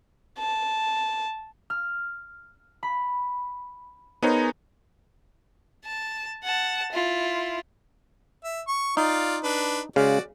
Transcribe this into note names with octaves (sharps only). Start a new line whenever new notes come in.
A5
F6
B5
B3 D#4 G#4 A#4 C5 C#5
A5
F#5 A5
E4 F4
E5
C#6
D#4 F4 D5 F5
D4 B4
C#3 G#3 F#4 D5 F5